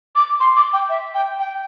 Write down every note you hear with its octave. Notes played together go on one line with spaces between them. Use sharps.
D6
C6
D6
G5
E5
G5
G5